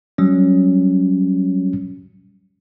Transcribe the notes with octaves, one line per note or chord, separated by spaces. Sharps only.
F#3 G3 C#4